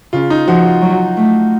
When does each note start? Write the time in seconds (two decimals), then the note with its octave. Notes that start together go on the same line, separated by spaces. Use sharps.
0.13 C#3 F4
0.30 D#4
0.47 F3 F#4
0.65 F4
0.82 F#3
1.17 A3